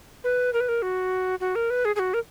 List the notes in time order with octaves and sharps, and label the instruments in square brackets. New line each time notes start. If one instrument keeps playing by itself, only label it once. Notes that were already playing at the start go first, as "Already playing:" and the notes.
[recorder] B4
A#4
B4
A#4
F#4
F#4
A#4
B4
G#4
G#4
F#4
A#4